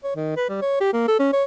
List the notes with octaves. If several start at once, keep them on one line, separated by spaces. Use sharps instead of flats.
C#5
D#3
B4
G3
C#5
G4
A#3
A4
C#4
C#5